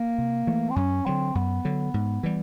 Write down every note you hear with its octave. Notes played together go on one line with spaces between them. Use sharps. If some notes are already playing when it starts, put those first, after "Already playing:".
Already playing: A#3
C3
E3 A3
C4
F#2 C#4
D3 F#3 C4
F#2 B3
D3 F#3
G#2
E3 G3